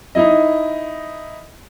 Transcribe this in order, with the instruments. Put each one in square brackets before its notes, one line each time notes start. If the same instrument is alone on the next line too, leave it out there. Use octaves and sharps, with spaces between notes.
[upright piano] D#4 E4 D#5